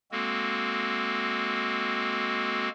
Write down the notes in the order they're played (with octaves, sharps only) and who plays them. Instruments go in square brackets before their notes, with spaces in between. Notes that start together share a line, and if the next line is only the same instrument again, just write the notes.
[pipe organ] G#3 A#3 C4 F#4 A4